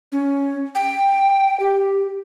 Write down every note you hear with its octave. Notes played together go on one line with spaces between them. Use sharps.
C#4
G5
G4